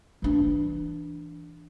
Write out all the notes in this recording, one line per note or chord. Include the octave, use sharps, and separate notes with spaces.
E3 D4